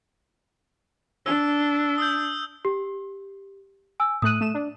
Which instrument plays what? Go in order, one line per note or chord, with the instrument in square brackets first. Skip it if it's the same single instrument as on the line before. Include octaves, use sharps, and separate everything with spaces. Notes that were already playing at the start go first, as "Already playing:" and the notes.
[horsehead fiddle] D4 [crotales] E6
[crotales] D#6 E6 G6
[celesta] G4
G#5 E6
[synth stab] A2 A3 F#6 [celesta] D#6 D#7
[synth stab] A3 E7
D4